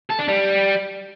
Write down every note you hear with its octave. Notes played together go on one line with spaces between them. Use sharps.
A4
D4
G3